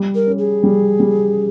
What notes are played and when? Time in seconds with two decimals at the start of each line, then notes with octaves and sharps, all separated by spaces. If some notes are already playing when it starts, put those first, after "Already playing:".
Already playing: G3
0.15 A#4
0.27 C#4
0.38 G#4
0.63 G3
1.00 G3